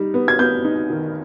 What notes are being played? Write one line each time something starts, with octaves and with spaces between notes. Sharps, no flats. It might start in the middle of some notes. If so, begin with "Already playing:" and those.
Already playing: G3 D#4
B3
G#6
B3 G6
D#4
D#3